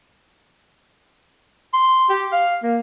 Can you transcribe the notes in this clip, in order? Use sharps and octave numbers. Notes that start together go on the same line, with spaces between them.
C6
G4
F5
A#3